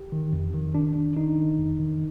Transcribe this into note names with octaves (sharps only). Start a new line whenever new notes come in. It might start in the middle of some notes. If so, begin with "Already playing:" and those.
Already playing: G4
D#3
F2
D#3
D#3 D4
D#3
D#3 D#4
D#3
F2
D#3